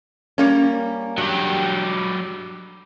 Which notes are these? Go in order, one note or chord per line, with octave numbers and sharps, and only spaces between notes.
G3 A#3 C#4
G2 F#3 G4